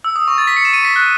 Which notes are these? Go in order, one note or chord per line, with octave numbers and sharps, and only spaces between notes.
E6
D#6
C#6
A6
B6
C#7
E7
D#7
B6
F#6